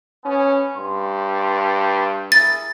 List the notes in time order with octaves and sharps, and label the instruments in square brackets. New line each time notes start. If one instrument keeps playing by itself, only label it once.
[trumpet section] B3 G#5 [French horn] C#4
[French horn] G2 [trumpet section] C6
[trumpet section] E4 G#4 A#4 [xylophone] A6